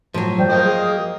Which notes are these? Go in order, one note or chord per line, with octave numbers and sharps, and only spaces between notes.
A2 F3 F#3
E3 G3 C5 G5
A#3 D#5 G5
G#4